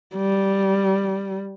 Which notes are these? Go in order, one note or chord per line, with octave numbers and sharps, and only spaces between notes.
G3